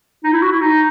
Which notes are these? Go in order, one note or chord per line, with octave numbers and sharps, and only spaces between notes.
D#4
E4
F#4
E4
D#4